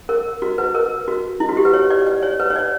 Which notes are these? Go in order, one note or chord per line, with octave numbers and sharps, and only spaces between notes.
A#4
F#4
B4
A#4
F#4
E4
F#4
G4
B4
C#5
D5
D5
C#5
B4
C#5
D5